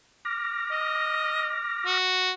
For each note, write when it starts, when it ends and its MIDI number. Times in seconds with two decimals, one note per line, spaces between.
0.25 1.98 86
0.25 1.98 89
0.25 1.98 94
0.71 1.55 75
1.86 2.31 66